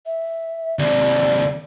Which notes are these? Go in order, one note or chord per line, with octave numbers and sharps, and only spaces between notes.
E5
D#2 C3 D5